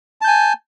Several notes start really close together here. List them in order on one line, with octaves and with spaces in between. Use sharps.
A5 G6 G#5